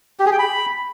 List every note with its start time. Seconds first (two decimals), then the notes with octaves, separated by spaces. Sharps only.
0.20 G4
0.26 G#4
0.32 G5
0.39 B5